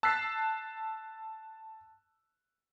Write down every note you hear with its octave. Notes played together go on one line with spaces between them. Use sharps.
A5 E6 F#6 A6 B6 C7